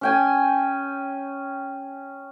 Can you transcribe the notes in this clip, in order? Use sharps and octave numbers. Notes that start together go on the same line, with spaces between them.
C#4 G5 G#5